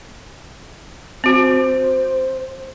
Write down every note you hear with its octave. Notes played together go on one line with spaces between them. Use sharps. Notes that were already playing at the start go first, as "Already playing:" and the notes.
C4 F#4 C5